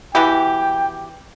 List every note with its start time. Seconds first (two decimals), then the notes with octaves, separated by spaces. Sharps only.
0.15 B2 E3 G4 G5